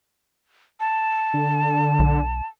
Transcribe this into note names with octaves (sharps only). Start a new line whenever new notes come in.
A5
D3
B1